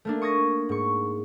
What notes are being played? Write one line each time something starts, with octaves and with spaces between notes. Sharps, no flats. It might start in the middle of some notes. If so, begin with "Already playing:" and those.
A3 A#3 D4
C#6 D#6 G#6 A#6
G#2 C#6